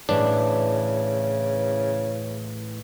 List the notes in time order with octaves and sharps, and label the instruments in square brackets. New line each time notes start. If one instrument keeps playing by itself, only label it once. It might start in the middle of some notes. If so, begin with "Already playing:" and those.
[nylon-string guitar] A2 E3 [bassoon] C#3 [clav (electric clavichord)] D4